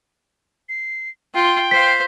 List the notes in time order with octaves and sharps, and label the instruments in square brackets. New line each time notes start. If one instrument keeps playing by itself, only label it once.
[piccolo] C7
[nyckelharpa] F4 C6 [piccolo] G5
[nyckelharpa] C5 F5 [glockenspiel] B6